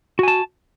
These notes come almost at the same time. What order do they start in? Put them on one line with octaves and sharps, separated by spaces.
F#4 G#5 A5